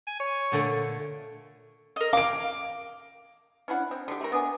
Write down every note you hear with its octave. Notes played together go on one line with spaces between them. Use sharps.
G#5
C#5
A#2 D3 A3
A#4 D#5
F5 D6 D7
C#4 D4 E4 F#5
C4
D3 G4
A3 A#4
B3 D4 G#5